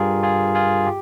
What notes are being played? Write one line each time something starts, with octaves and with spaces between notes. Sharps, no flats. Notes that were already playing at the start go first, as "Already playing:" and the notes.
Already playing: G2 G3 F4 G4 G#4 A#4
F4 G#4
F4 G#4
G4